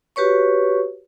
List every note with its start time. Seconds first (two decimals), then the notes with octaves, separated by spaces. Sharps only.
0.16 F#4 G4 B4 C#5 C#6